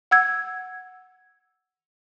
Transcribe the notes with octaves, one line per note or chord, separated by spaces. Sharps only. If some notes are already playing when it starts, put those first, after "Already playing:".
F#5 E6 G#6